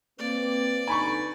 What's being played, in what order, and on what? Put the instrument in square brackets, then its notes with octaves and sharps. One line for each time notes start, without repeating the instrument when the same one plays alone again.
[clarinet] A#3 [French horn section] C4 B4 [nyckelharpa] D5
[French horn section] D3 B4 [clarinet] D#4 [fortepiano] G#5 B5 C#6